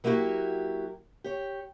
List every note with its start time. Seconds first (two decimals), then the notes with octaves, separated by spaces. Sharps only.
0.04 F#3 A#3 E4 F#4 G4
1.24 G4 C#5